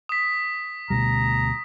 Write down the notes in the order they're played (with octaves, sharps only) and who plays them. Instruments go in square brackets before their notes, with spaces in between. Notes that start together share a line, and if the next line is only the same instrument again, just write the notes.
[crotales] D#6 B6
[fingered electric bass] D2 B2 G3 [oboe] A#5